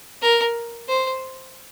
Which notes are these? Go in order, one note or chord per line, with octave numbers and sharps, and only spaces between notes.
A#4
C5